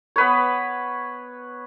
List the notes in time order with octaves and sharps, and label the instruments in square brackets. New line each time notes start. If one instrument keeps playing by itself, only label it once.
[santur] B3 B4 C#5